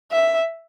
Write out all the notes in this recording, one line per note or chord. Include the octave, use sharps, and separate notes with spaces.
E5